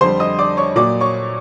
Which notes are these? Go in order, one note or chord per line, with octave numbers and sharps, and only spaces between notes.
F2 D3 G3 C5 C6
D#5 D#6
D5 D6
C#5 C#6
A#2 F#3 A#3 D5 D6
C#5 C#6